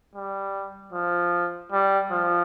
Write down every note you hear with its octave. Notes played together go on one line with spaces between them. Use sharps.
G3
F3
G3
F3